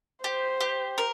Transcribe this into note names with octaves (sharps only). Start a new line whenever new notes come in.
G4 C5
G4
A#4